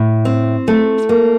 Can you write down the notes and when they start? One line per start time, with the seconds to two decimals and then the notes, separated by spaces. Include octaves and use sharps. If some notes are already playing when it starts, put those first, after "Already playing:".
Already playing: A2
0.25 C4
0.68 A3
1.09 A#3